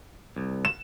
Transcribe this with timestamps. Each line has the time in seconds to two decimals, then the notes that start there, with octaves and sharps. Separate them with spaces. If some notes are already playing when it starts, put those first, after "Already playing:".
0.36 C2
0.65 E7